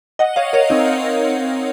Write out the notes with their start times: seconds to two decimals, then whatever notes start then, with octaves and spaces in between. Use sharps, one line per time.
0.19 D#5 F#5
0.36 C#5 F5
0.53 A#4 C#5
0.70 C4 D#4